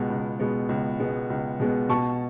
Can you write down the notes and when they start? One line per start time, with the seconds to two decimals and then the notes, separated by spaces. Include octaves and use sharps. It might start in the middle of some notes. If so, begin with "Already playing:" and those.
Already playing: C#2 B2 G#3 B3
0.10 C#2
0.40 B2 G#3 B3
0.69 C#2
1.00 B2 G#3 B3
1.30 C#2
1.60 B2 G#3 B3
1.89 B2 A5 C#6